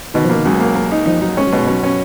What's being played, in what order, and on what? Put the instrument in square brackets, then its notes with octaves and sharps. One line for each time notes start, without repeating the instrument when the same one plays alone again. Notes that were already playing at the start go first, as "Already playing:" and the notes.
[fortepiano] B2 [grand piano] D#3
[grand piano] F3
[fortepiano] A#3
[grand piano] D#3
[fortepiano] C#2 [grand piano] F#3
[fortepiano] A#3
A#3
D#4
[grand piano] F3 [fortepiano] D#4
[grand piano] F#3 [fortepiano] D#4
[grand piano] G#3 [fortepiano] C#4
[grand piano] F#3
[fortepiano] B2 [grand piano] G#3
[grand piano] F#3 [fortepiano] C#4
[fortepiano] C#4